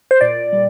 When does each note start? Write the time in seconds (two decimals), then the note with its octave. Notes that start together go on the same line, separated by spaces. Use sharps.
0.11 C5
0.21 A#2 D5
0.53 G3